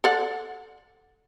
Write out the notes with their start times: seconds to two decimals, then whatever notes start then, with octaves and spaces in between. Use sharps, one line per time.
0.04 A4 D5 F#5